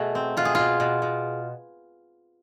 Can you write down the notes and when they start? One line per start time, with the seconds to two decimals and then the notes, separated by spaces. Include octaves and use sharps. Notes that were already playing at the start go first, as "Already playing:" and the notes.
Already playing: B2 A3 G#4
0.15 C4
0.37 B2 F4
0.45 G#4
0.55 B2 F4
0.80 B2
1.02 B2